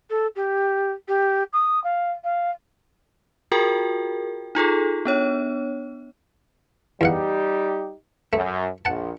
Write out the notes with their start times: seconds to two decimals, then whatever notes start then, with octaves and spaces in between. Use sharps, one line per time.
0.09 A4
0.35 G4
1.08 G4
1.53 D#6
1.83 F5
2.23 F5
3.52 F4 F#4 G#4 A#4 G5
4.55 D#4 F4 G#4 A4
5.05 B3 D4 C#5
7.01 E2 G3 D#4 G4 F5 F#5
8.33 F#2 A3
8.85 A#1 F#5 A5